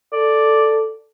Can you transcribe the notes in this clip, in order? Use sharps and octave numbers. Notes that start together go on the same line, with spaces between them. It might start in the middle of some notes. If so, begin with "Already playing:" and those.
A4 D5